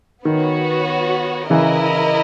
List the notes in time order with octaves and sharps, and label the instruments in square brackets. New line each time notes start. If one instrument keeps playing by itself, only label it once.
[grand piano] D#3 [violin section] B3 F#4 C#5
[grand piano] C#3 E3 [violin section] E4 A#4 D#5